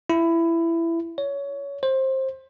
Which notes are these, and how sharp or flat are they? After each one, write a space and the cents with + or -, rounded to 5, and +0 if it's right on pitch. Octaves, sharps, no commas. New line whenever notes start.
E4 +15
C#5 +20
C5 +20